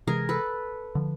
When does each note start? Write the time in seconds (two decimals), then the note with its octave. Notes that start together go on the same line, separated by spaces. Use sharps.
0.07 C3 E3 G#3 G#4 A#4
0.29 A4 B4
0.95 D3 F3